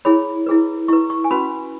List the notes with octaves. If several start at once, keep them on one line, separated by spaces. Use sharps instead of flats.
E4 G#4 C#5 B5
E4 G#4 B4
E4 B4 C#6
C#6
G#5
C#4 F#4 B4 B5